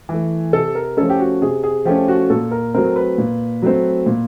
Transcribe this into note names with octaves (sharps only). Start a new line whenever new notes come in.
E3 A3
C3 A4
A#4
F3 A3 C#4 A4
G4
F#4
C3 G#4
G#4
F3 A3 C#4 G4
F#4
A#2 A4
A#4
F#3 A3 C4 A#4
B4
A#2
F#3 A3 C4
A#2